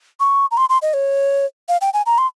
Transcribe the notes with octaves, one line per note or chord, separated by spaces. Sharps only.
C#6
A#5
C6
C6
D#5
C#5
F5
G5
G#5
A#5
C6